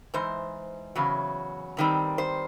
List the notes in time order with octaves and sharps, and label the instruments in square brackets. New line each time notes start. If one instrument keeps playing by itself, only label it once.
[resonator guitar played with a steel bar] G#2 E3 C5
E2 C#3 F#3
G2 D#3 G3 C4
C5